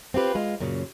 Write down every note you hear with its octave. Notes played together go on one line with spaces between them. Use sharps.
C4 F4 G4 B4
G#3 F4
F#2 A#2 C#3